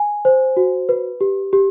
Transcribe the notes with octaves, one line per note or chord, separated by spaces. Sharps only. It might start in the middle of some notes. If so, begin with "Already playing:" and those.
Already playing: G#5
C5
F#4
B4
G4
G4